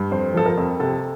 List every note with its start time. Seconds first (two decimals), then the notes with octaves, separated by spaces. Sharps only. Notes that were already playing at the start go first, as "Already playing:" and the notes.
Already playing: G2
0.11 F2 C5
0.34 F3 A4
0.46 A#4
0.57 F2
0.80 C3 A4